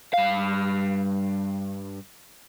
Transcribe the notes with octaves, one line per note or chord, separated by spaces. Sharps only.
G2 F5